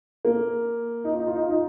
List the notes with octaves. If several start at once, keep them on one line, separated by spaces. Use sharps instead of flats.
A#3
D#4
F4
D#4
F4
D#4
F4
D#4